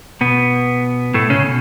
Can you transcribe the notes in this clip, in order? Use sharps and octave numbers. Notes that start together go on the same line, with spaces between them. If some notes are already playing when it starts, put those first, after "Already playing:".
B2 B3
A2 A3
C#3 C#4
B2